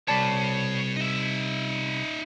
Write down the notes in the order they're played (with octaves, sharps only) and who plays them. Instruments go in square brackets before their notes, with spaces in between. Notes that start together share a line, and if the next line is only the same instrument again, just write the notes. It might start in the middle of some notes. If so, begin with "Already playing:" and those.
[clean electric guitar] C2 D5 A5 [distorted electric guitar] C#5 B5
[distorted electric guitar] D#4 E5